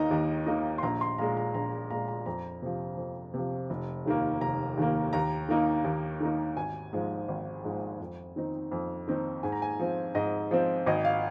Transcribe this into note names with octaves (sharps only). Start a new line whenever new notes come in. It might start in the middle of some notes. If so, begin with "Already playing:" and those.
Already playing: D#2 D#3 A#3 D#4 D#5 A#5
D#2
D#3 A#3 D#4
C6
A#1 A#5
C6
A#2 G#3 A#5
A#5
A#1 A#5
A#5
A#2 G#3 A#5
A#5
F2 A#5
C3 F3
F2
C3 F3
F1
D#2 D#3 A#3
F1 A#5
D#2 D#3 A#3
D#2 A#5
D#3 A#3 D#4
D#2
D#3 A#3 D#4
G#1 G#5
G#2 F3 G#3
G#1
G#2 F3 G#3
F2
D#3 C4 D#4
F2
D#3 C4 D#4
G#2 G#5
A#5
G#5
F3 C4
G#2 D#5
F3 C4
G#1 D#5
F5